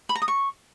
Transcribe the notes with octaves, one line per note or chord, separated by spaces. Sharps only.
B5
A#5
D#6
C#6